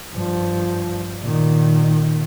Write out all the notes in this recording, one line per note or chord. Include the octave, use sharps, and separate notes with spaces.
G2 F3
A#2 D#3